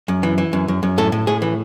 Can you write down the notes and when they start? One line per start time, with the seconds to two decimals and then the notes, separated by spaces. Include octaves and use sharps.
0.08 F#2
0.23 E3
0.38 E3
0.53 F#2
0.68 F#2
0.83 F#2
0.98 A2 A4
1.12 A2
1.27 A2 G#4
1.42 E3